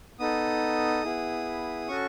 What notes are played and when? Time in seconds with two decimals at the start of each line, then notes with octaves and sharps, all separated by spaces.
0.19 B3 D#4 A4 D#6
1.04 B3 E4 G#4
1.88 C#4 F#4 A4 C#6